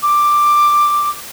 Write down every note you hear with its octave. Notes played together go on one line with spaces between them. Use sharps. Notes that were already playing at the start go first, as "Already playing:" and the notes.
D6